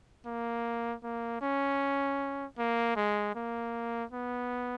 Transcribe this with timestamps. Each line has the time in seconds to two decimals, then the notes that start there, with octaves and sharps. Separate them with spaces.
0.26 A#3
1.04 A#3
1.42 C#4
2.59 A#3
2.96 G#3
3.35 A#3
4.11 B3